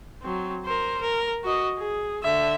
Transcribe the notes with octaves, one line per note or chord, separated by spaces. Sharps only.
F#3 C4
A#4 C5
A#4
F#4 D#5
G#4
D3 E5